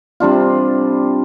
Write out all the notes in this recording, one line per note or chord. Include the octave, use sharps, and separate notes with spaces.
C3 G3 D4 F4